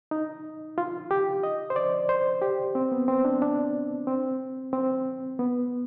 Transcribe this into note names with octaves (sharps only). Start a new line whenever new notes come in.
D#4
F4
G4
D#5
C5
D5
C5
G4
C4
B3
C4
D4
D4
C4
C4
B3